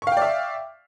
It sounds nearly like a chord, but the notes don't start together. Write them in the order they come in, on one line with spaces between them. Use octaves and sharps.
C#6 F5 G5 D5 E5